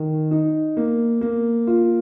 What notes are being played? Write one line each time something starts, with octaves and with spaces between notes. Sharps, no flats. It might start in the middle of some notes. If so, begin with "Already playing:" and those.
Already playing: D#3
D#4
A#3
A#3
F4